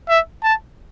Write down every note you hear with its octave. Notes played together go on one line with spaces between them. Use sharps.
E5
A5